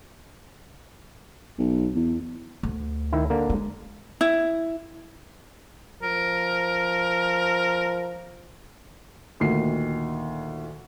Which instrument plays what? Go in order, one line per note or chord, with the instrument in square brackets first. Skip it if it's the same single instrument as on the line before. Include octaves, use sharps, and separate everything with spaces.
[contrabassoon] B1
E2
[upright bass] D2
[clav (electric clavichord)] D#3 E4
D3 A#3
[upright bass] G#3
[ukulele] E4
[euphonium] F3 [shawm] A#4
[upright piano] D2 A#2 D#3 C7